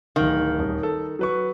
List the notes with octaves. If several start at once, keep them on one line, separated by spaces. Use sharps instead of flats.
D1 D#3 F5
D#1
A4
F#3 B4 C#6